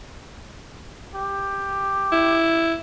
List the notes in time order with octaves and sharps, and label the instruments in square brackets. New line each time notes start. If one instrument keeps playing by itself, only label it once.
[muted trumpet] G4
[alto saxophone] E4